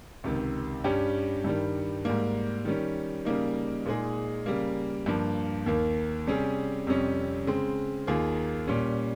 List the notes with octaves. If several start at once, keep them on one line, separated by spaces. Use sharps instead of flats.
C#2 C3 D#3
G2 G3 C#4 G4
G2 D#3 G3
G#2 G3 A#3
D#3 G3 C#4
C#3 G3 A#3 D#4
A#2 G#3 D#4 G#4
C#3 G3 A#3
G2 F3 A#3
D#2 D#3 A#3
C3 G3 C#4 G#4
F2 C3 G3 C#4
C#3 G#3 C4
D#2 D#3 A#3 F4 G#4
A#2 G3 C#4